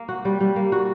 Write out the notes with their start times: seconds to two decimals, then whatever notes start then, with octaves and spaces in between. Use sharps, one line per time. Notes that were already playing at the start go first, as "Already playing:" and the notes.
Already playing: A#3
0.09 F#4
0.25 G3
0.41 G3
0.56 A#3
0.72 F#4